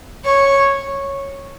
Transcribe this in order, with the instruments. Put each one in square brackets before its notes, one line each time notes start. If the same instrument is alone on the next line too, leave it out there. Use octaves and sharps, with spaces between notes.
[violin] C#5